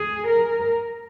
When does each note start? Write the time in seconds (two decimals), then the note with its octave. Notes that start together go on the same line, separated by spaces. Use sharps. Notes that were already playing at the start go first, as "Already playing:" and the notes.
Already playing: G#4
0.27 A#4